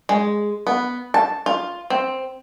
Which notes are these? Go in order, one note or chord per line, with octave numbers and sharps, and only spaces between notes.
G#3
B3
A5
F4
C4